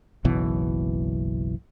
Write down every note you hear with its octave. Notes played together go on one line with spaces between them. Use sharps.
F#1 B1 B2 E3